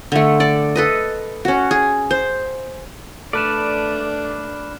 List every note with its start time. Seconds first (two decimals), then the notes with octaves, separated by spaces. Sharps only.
0.12 D3 A3
0.40 A4 D5
0.76 A4 B4 D#5
1.45 C#4 F#4
1.71 G#4
2.11 C5
3.33 A3 D4 B4 D5 F6 F#6 E7